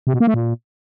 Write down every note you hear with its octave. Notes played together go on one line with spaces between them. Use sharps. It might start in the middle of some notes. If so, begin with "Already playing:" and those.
C3
B2
A#3
A3
A#2